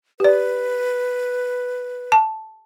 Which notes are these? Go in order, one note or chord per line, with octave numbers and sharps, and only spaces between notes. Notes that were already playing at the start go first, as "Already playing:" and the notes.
G4 B4 D5
A5